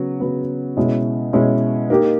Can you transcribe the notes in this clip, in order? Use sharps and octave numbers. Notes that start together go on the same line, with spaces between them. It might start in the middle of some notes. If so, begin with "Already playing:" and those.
Already playing: C#3 F#3 B3
C#3 F#3 B3
B2 G#3 C#4 E4
B2 G#3 C#4 E4
A#3 D#4 G4